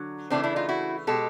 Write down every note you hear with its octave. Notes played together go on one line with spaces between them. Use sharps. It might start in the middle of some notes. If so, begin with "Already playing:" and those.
Already playing: D3 F#3
C#3 E3 A3 C4 D4
D4 E4
D#4 F4
E4 F#4
B2 G#3 G4 A4